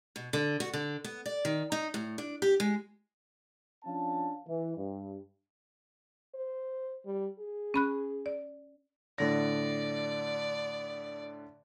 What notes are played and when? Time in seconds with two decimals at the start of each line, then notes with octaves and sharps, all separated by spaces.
0.16 B2
0.33 D3
0.60 F#4
0.73 D3
1.04 B3
1.26 D5
1.45 D#3
1.72 D#4
1.94 A2
2.18 D4
2.42 G4
2.60 G#3
3.85 F3 C#4 D4 F5 A5
4.47 E3
4.77 G2
6.35 C5
7.05 G3
7.39 G#4
7.74 C#4 B5 F#6
8.26 D5
9.18 A2 D3 D5 A#6